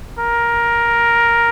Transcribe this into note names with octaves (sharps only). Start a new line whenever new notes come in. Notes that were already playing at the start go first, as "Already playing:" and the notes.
A#4